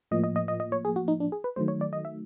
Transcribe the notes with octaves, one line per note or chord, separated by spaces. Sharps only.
A2 F3 A#3 D#5
D#5
D#5
D#5
D#5
C#5
G#4
F#4
D#4
D4
G#4
B4
D#3 F#3 A3 C5
C#5
D5
D#5
E5